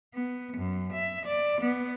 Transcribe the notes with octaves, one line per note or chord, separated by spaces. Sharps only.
B3
F#2
E5
D5
B3